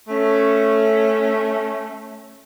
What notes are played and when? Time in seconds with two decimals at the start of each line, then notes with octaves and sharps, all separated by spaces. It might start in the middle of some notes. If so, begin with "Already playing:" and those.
0.08 A3 C#4